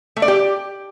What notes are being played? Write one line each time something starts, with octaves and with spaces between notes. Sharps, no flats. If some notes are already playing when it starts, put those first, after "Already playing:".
A3
D5
G4